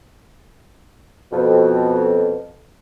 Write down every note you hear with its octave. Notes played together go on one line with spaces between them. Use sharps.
F2 B2